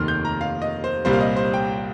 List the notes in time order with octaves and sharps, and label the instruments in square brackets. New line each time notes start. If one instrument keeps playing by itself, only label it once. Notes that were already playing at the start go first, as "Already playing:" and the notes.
Already playing: [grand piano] F1 D#2 D#3 C6 F6
G6
A#5
F5
D#5
C5
C2 A#2 G3 A#3 C5
F5
D#5
C5
G5